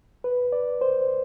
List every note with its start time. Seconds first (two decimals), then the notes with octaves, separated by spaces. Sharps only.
0.24 B4
0.52 D5
0.81 C5